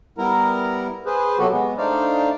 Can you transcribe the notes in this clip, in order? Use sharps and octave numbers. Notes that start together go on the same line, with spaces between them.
G3 B3 E4 A#4 A#5
G#4 B4 C5
C3 F#3 B3 F#4 G4 A4
G#3 B3
A3 D4 D#4 C5 D5 F5